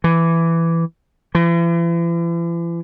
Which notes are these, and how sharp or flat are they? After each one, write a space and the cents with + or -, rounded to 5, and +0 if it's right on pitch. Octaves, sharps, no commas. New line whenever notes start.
E3 +10
E3 +45